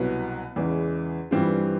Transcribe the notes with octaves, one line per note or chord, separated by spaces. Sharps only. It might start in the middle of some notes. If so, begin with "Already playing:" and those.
Already playing: C2 B2 F#3 B3
E2 C#3 E3 G#3
G2 E3 G3 C4 F4